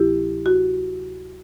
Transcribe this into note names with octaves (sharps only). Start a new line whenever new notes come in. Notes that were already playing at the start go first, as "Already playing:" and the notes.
Already playing: D2 C3 F#3 E4 G4
F#4